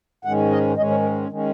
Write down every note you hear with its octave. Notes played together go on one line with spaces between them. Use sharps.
G#2 D#3 G#3 C#4 F#5
D#5
G#2 D#3 G#3 C#4 D#5
C#5
A#4
D#3 G#3 C#4